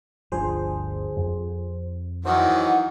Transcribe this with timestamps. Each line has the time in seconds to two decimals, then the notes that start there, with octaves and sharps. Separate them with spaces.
0.32 G1 D2 F3 D4 G#4 C5
1.16 F2
2.25 D#3 E3 F#3 C5 D#5 E5 F#5